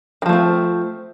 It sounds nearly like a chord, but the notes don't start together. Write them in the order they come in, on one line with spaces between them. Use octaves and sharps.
D#3 F3 A3 C4